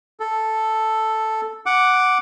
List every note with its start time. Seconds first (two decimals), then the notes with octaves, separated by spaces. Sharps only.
0.20 A4
1.66 F#5 D6